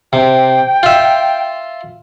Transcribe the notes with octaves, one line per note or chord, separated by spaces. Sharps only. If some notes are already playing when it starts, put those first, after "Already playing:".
C3 G5
F4 E5